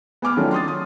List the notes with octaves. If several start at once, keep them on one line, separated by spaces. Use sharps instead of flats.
B3 G#5 D6 F6
D#3 F#3 A3 C#4 D4 F4
C6 D#6 A6
D#6